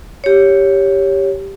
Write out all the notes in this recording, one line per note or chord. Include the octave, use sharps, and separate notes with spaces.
G4 C#5